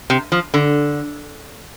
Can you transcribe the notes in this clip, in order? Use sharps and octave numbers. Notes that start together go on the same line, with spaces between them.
C3
F3
D3